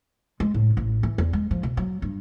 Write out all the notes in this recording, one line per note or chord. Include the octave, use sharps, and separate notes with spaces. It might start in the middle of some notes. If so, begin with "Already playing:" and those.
G#3
A2
A1
E3
E2
G#3
F3
B2
F#3
G2